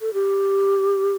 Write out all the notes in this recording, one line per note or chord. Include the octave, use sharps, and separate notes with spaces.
A4
G4